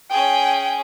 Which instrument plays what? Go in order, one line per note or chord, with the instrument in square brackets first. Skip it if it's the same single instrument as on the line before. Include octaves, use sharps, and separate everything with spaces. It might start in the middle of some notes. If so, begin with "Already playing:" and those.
[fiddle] C#4 G#4 [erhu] G5